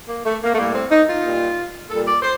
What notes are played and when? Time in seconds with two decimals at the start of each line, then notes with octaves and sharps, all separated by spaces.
0.09 A#3
0.24 A3
0.42 A#3
0.53 A3
0.57 A2 G3 A#3
0.74 C4
0.91 D#4
1.08 F4
1.23 A#2 G3
1.89 A#2 G3 A4
2.06 D5
2.22 C5